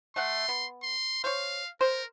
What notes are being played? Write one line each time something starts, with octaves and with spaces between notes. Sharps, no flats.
A3 F#5 C6
B3
C6
C5 C#5 F5
A#4 C5